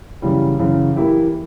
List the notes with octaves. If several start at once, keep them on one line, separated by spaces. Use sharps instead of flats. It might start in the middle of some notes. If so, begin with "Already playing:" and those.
F#2 C#3 E3 G3
F#2 C#3 E3
E3 A#3 E4 G4